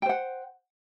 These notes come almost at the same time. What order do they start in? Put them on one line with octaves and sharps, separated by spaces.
G5 C5 F#5